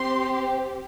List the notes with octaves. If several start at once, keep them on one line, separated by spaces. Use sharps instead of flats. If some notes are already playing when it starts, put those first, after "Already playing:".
Already playing: C4 G4 C6